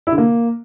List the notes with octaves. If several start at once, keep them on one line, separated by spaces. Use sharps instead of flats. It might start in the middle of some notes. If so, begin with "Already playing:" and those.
E4
D3
A#3